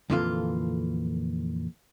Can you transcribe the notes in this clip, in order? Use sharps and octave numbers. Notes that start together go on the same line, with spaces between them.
F2 A#2 D3 E3 F4